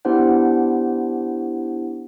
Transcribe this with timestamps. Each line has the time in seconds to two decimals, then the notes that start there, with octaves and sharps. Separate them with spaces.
0.05 B3 D4 E4 G4 C5 F#5